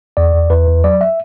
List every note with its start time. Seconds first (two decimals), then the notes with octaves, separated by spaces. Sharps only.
0.17 E2 D5
0.34 E2
0.50 E2 B4
0.68 E2
0.84 F#3 D5
1.01 E5